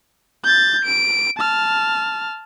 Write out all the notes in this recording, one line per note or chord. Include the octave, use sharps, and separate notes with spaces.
G6 A6
D7
A5 F6